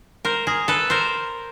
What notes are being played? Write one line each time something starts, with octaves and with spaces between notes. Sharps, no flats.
A#4 C5
G#4 A#4
A4 B4
A#4 C5